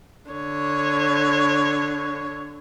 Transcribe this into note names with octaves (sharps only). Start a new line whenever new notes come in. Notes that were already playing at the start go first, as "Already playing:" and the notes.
D3 C#5